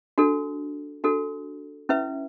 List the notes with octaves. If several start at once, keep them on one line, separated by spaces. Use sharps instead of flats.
D4 F#4 A4
D4 F#4 A4
C#4 E4 B4 E5